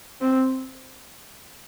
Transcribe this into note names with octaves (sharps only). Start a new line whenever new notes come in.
C4